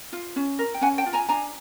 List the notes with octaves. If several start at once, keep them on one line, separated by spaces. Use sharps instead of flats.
F4
C#4
A#4
G5
C#4 F#5 G#5
G5 A5
F4
G#5 A#5
D4 G#5 A#5